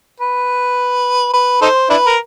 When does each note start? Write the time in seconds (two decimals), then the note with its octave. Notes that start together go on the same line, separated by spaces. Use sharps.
0.20 B4
1.33 B4
1.62 D#4 A4 C5
1.90 D4 E4 B4
2.06 A#4